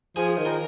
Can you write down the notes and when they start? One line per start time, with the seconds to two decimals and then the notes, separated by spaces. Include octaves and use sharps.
0.17 F3 G#4
0.37 D#3
0.46 A#4